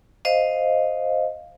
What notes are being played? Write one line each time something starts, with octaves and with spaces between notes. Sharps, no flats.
C5 D#5 F5